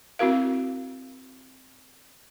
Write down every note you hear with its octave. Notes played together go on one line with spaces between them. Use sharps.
C4 E4 F#4 A#4 F5